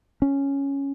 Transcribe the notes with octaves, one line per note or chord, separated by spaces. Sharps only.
C#4